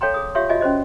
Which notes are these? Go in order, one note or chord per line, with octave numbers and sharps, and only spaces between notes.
A4 C#5 F5 G5 A#5 C6
G#4 D#6
F4 G4 C#5 E5 F5 C6
F4 F#4 D#5 E5 G#5
C#4 F#4 C5 D#5